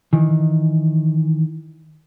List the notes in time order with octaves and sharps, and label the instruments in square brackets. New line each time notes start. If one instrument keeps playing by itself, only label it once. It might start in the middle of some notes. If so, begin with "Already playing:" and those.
[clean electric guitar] D#3 E3